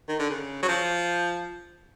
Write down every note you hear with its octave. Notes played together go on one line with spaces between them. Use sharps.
D#3
D3
C#3
F#3
F3